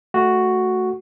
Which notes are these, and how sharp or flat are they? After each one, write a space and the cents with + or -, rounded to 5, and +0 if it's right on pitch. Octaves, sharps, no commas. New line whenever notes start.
A3 +0 F#4 +0